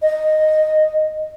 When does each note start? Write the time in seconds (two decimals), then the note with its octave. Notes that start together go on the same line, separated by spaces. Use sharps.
0.02 D#5